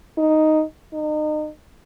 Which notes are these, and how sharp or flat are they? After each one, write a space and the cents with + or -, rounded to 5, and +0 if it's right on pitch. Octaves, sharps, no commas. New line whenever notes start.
D#4 +0
D#4 -35